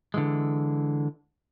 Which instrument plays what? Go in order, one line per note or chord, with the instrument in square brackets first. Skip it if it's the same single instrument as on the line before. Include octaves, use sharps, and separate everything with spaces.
[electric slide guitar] D3 E3 G#3